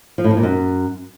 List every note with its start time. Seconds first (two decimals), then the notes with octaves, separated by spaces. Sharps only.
0.18 F3
0.24 A2
0.31 F3
0.37 A#2
0.43 F#2